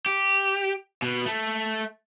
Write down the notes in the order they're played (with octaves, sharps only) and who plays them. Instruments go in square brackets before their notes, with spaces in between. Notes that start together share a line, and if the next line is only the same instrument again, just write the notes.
[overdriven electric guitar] G4
B2
A3